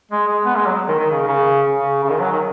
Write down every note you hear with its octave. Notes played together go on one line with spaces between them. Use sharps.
G#3
G#3
B3
G#3
F#3
D#3
D#3
C#3
C#3
C#3
C#3
D#3
F#3
D#3